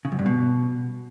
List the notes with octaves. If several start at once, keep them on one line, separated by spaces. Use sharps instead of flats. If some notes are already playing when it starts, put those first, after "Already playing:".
C#3
F#2
G2
B2